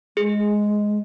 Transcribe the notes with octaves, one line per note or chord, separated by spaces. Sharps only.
G#3 G#4